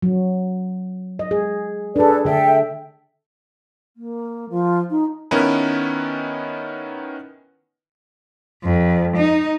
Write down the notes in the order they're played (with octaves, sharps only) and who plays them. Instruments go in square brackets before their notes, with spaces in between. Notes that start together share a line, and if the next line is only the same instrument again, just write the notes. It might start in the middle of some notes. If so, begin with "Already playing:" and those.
[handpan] F#3
D#5
G#4
[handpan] D4 G#4 [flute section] A4 B4 D5
[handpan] D3 A4 [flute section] E5 G5
[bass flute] A#3
F3
D#4
[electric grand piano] D#3 B3 C#4 E4 A#4 B4
[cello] F2
D#4